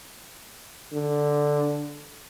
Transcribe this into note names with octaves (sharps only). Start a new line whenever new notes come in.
D3